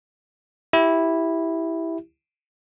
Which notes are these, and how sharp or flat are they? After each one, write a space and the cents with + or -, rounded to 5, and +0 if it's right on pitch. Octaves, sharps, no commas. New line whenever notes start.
E4 -5 G4 -5